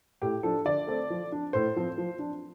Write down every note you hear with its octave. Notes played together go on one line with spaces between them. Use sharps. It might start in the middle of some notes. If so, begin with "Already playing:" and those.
A2 G4
F3 D4 A4
D3 D5
A3 C4
F3
D4
A2 C5
F3 C4
F3
D4